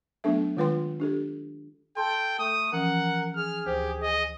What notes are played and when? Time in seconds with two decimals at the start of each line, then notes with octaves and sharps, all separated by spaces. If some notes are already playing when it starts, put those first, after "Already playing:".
0.24 F#3 A3 B3 D4 A4 E5
0.57 D#3 G#3 F4 B4 G5 C6
1.00 D4 G4 A4
1.97 A4 G5 A5 C6
2.39 A3 A4 D#6
2.73 E3 F3 C#4 A#4 F#5
3.36 G#4 F6
3.66 D2 G4 C5
4.03 D#5